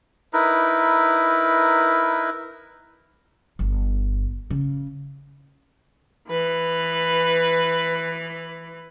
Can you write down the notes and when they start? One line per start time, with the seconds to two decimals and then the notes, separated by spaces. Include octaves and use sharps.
0.33 D#4 E4 A#4 B4
3.59 G1
4.51 C#3
6.28 E3 B4